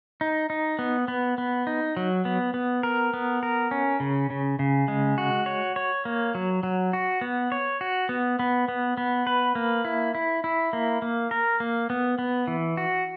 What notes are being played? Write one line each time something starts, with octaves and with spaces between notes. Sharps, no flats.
D#4
D#4
B3
B3
B3
D#4
F#3
B3
B3
A#4
B3
A#4
C#4
C#3
C#3
C#3
G#3
F#4
C#5
C#5
A#3
F#3
F#3
F#4
B3
C#5
F#4
B3
B3
B3
B3
B4
A#3
E4
E4
E4
A#3
A#3
A#4
A#3
B3
B3
E3
F#4